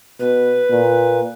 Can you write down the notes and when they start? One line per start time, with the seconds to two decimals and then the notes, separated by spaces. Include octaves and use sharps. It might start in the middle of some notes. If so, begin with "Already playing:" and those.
0.20 B2 B4
0.70 A#2